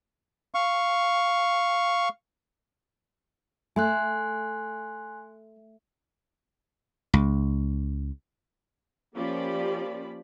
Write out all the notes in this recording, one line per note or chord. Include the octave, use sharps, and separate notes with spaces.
F5 C#6
A3 G#5 C6 F#6
C#2
F3 A#3 C#4 G4 D5 B5